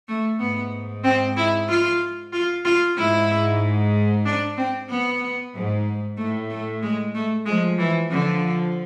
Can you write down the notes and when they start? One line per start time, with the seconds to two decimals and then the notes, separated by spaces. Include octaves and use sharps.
0.08 A3
0.39 G#2 B3
1.04 C4
1.36 E4
1.69 F4
2.33 F4
2.65 F4
2.96 G#2 E4
4.25 D4
4.57 C4
4.89 B3
5.54 G#2
6.17 A2 A3
6.50 A3
6.82 G#3
7.14 A3
7.46 F3 G#3
7.78 E3
8.11 D3 F3